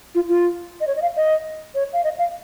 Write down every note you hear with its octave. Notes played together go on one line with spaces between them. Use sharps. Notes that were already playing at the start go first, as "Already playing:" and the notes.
F4
F4
D#5
C#5
D#5
F5
D#5
C#5
F5
D#5
F5